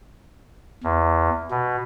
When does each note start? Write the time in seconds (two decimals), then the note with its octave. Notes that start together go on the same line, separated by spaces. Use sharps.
0.84 E2
1.51 B2